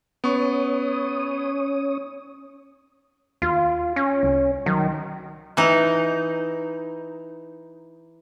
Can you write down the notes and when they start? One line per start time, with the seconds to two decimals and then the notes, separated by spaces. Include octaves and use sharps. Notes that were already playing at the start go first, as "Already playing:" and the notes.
0.24 B3 C#4 C#5 C#6 D#6
3.42 D#2 F4
3.96 C#4
4.23 C2
4.66 D#3 F#3
5.57 E3 D#4